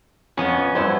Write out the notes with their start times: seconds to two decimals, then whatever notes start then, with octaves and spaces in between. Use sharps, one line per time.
0.37 F2 B3 C#4
0.75 G2 F#3 E4 C5